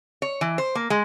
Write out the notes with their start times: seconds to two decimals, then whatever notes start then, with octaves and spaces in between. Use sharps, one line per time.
0.22 C#5
0.41 E3
0.58 C5
0.75 A#3
0.90 G#3